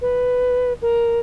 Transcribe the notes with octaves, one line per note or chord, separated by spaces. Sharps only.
B4
A#4